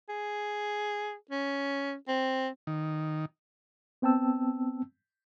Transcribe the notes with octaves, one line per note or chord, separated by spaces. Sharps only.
G#4
C#4
C4
D#3
B3 C4 G5 A5 E6